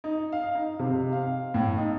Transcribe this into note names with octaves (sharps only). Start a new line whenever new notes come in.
D#4
F5
D#4
C3
F5
A2
D#4